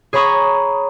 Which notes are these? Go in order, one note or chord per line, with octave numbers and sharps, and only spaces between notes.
G#4 C#5 A#5 B5 C#6 D#6